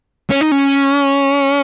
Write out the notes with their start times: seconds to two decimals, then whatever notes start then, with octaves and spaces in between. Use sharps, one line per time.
0.30 C#4
0.41 D#4
0.52 C#4